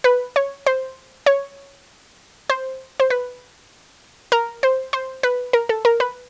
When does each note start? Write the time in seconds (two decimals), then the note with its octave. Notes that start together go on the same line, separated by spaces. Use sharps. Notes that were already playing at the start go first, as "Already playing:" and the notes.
0.04 B4
0.36 C#5
0.66 C5
1.26 C#5
2.50 C5
3.00 C5
3.10 B4
4.32 A#4
4.63 C5
4.93 C5
5.23 B4
5.53 A#4
5.69 A4
5.85 A#4
6.00 B4